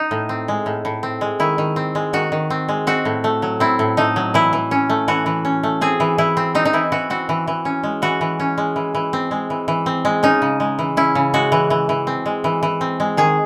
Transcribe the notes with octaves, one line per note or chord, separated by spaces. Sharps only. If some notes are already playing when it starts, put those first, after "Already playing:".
Already playing: D#4
A2
C4
G#3
A2
A2
C4
G#3
D#3 E4
D#3
C4
G#3
D#3 F#4
D#3
C4
G#3
C4 F#4
A2
A3
F#3
C4 E4
A2
A3 D#4
F#3
E3 E4
E3
C#4
A3
E3 F#4
E3
C#4
A3
C4 G#4
E3
E3 E4
C4
C4 D#4
D#4
E3 E4
E3 F#4
C4 F#4
E3
E3
C#4
G#3
E3 F#4
E3
C#4
G#3
E3
E3
C4
G#3
E3
E3
C4
G#3
C#4 D#4
C#3
G#3
E3
C#4 E4
C#3
G#3 F#4
E3
E3
E3
C4
G#3
E3
E3
C4
G#3
D#3 G#4